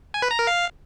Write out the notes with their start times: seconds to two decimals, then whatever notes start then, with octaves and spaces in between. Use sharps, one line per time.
0.14 G#5
0.22 B4
0.31 A#5
0.39 A#4
0.47 F5